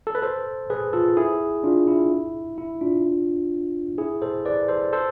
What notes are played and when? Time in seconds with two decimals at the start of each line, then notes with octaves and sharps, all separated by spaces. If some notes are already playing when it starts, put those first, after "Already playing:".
0.07 A4
0.15 B4
0.22 A4 C5
0.70 G#4 B4
0.93 F4 A4
1.17 E4 G#4
1.64 D4 F4
1.87 E4
2.58 E4
2.81 D4 F4
3.98 E4 G#4
4.22 A4 C5
4.45 B4 D5
4.68 A4 C5
4.93 A4 C5